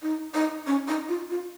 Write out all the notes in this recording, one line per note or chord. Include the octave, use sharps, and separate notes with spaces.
D#4
D#4
C#4
D#4
F4
F4